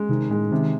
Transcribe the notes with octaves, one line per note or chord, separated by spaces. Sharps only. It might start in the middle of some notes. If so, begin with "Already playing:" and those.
Already playing: G#3
C3 D#3
A2 G#3
C3 D#3